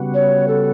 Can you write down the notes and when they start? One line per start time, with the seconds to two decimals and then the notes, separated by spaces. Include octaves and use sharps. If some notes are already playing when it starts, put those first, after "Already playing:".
Already playing: C#3 G3 B3 F#4
0.14 C#5
0.48 A4